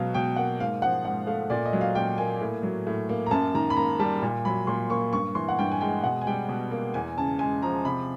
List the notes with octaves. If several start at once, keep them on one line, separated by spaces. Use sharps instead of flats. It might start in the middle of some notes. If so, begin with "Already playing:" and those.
Already playing: B2 F#3 F5
B2 G5
A#3 F#5
G#2 F5
F3 F#5
G#2 F#5
A3 F5
A#2 D5
D#5
F#3
F5
A#2 G5
A#3 G#5
A2
F#3
A2
A#3
A#5
F#2 A5
D#3 A#5
B5
A#3 A#5
G3 A5
A#2
F#3 B5
A#2 C6
A#3 C#6
G2 C#6
E3 C6
F#5
G2 G5
G#5
G#3 G5
B2 F#5
G#5
G3 G5
B2
A#3
E2 G#5
C#3 A5
G#3 G#5
F3 A#5
C3 B5